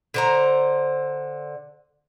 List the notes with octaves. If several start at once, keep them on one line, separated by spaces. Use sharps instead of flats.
D3 C5 A#5